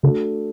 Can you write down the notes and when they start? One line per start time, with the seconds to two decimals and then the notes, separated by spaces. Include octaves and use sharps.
0.03 C#3 A3 D4 F#4 A4